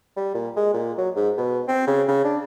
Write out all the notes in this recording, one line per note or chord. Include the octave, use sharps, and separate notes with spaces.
G3
A#2
G#3
A#2
F#3
G#2
B2
C4
C#3
C#3
D4